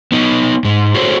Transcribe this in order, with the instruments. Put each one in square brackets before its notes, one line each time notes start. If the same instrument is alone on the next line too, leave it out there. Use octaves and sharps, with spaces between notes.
[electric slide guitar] B3 D#4
G#2 G#3
F#4 G#4 A4 C5 C#5